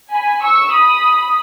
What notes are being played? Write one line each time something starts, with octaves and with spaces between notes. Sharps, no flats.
G#5 B5
C#6 E6
B5 D#6